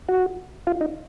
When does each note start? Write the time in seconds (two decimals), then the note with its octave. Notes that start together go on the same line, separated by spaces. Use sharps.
0.09 F#4
0.67 F4
0.81 D#4